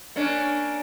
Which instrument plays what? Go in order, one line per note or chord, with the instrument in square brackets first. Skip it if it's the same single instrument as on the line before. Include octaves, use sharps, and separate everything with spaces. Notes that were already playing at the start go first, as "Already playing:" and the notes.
[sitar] A#3 C#4 D4